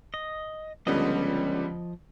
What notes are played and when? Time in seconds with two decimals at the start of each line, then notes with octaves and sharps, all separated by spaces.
0.14 D#5
0.87 C#2 D3 F3 G3 B3 D#5 D#6